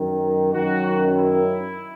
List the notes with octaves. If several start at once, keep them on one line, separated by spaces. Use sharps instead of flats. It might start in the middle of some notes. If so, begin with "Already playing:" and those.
Already playing: F#2 D#3
F#2 D#3 F#4
E4